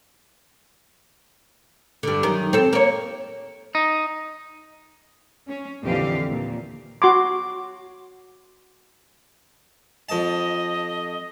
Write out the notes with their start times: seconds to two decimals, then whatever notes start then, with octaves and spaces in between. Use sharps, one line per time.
2.03 G2 D3
2.23 F#2 D#3
2.53 C4 A4
2.73 A#3 C#5
3.75 D#4
5.48 C#4
5.82 F2 A#2 D3 E3 G4 F5
6.25 D#2 A#2
7.02 F#4 C6 D6
10.09 F2 D#5 A5